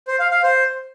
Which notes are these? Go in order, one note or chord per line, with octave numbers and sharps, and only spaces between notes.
C5
F5
F5
C5